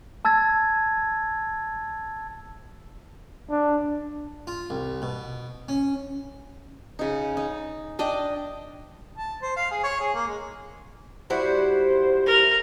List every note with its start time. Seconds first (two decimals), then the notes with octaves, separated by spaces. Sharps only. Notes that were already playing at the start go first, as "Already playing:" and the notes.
0.25 A5 E6 G#6 A6
3.50 D4
4.47 F4
4.70 C2
5.02 B2
5.69 C#4
6.99 C#3 D#4
7.37 D#4
7.99 D4 D#5 G5
9.18 A5
9.42 C5
9.57 F5
9.71 G#4
9.83 C#5
10.00 G#4
10.14 A#3
10.27 G#3
11.30 G3 E4 F#4 C5
12.26 A#4